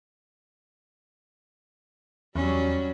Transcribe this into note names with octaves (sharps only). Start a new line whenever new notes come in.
E2 F#3 G3 C#4